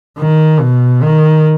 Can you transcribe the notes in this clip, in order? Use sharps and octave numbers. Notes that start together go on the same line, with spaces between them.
D#3
B2
D#3